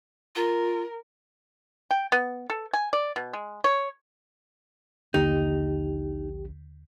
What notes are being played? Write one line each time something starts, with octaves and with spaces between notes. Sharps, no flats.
F4 A#4
G5
B3
A4
G#5
D5
B2
G#3
C#5
A#1 D#2 D3 A#3 D#4 G4